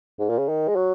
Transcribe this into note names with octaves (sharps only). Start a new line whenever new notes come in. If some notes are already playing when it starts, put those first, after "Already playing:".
G#2
A#2
C#3
D#3
G#3
F#3